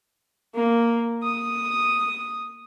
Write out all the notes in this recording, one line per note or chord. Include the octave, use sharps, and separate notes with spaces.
A#3
D#6